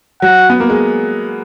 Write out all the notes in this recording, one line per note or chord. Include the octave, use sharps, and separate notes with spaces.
F#3 F#5
B3
A#3
G#3